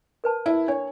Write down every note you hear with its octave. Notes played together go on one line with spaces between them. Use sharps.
A#4 B4 A5
E4
D4 C#5